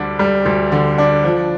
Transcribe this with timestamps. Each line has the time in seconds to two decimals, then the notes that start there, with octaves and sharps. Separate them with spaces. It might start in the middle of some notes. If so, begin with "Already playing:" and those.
Already playing: D2 D3 G3 D4
0.19 G3
0.46 D2
0.72 D3
0.98 D4
1.24 F3